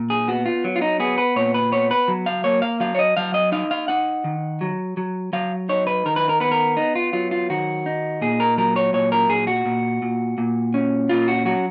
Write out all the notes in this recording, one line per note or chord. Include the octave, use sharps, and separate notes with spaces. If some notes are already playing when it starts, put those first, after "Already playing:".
Already playing: A#2
G#4
B3 F#4
F4
F#3
F4
D#4
B3 G#4
B4
A#2 C#5
B4
B3 C#5
B4
F#3
F5
A#3 C#5
F5
F#3 F5
C#5
D#5
F#3 F5
D#5
D#4 F5
F5
D#4 F#5
D#3
F#3
F#3
F#3 F5
D#4 C#5
B4
D#3 A#4
B4
A#4
B3 B4
A#4
B3 D#4
F4
F#3 F4
F4
D#3 F#4
D#4
A#2 G#4
A#4
F#3 A#4
C#5
A#2 C#5
A#4
A#2 G#4
F#4
A#2
A#2
A#2
C#4
A#2 F4
F#4
F#3 F#4